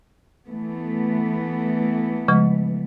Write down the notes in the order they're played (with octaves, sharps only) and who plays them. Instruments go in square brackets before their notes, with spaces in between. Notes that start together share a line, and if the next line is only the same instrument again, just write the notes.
[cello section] E3 A3 B3
[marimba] C#3 F3 G#3